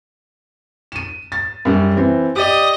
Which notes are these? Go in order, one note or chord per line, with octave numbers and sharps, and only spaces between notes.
D#7 E7
A6
F#2 G3
E3 C4
G4 D5 D#5